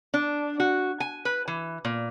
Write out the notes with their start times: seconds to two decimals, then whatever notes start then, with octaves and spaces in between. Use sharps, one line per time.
0.14 D4
0.60 F#4
1.00 G#5
1.25 B4
1.48 E3
1.85 A#2